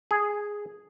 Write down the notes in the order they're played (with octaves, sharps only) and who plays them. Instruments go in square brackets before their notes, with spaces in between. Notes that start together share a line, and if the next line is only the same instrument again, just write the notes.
[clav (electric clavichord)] G#4